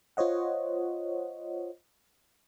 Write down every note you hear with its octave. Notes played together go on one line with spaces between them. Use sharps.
F4 C5 C#5 D#5 F#5